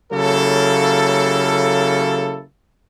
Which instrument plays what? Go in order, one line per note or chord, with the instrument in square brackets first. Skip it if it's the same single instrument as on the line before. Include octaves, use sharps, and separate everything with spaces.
[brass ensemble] C#3 F#3 A#3 E4 G4 A4